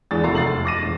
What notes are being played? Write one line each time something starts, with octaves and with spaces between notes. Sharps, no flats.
E2 G#3 D4 D#6 A6
F1 A3 F#4 A#5 C6 C7
F1 A6 C7 F#7
D6 A#6 D#7
E1